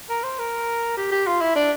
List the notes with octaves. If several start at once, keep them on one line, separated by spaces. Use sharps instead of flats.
A#4
C5
A#4
G4
G4
F4
E4
D4